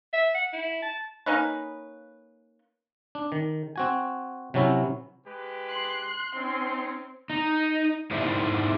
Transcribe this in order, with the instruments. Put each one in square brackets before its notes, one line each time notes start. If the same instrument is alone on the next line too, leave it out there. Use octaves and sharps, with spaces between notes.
[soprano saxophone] E5
F#5
E4
A5
[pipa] A#3 C#4 D#4 B4
[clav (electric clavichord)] D4
D#3
C4 F#4 G#5
C3 F#3 C#4 E4
[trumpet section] G#3 G4 B4
[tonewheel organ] C6 [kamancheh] F#6
[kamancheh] C4 [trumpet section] C#4 D#4
[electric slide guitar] D#4
G#2 D4 E4 C5 E5